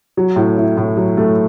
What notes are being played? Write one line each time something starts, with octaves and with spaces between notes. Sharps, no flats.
F#3
A2
E4
A2
F#3
A3